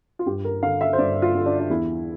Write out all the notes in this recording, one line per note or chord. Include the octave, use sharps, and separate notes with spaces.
F4
G2 G4
A#4
D3 F5
E5
C5
G2 D5
F4
D3
D4
D4
E2 E4